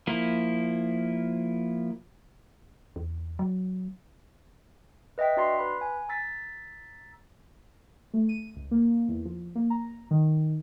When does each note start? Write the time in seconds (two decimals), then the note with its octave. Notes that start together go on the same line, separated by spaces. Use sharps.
0.07 F3 A#3 E4
2.96 E2
3.39 F#3
5.18 B4 D#5 E5 G5 B6
5.36 D4 F#4 D5 A#5 C6 C7
5.59 B4 B5
5.81 G#5
6.09 A#5 E6 A6 B6
8.14 A3
8.29 D#7
8.56 C#2
8.71 A#3
9.08 E2
9.25 F3
9.55 A#3
9.70 A#5
10.11 D#3